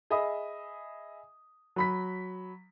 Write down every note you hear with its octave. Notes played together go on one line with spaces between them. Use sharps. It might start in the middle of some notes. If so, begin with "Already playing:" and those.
G#4 D#5 E5 B5 D#6
F#3 B5 B6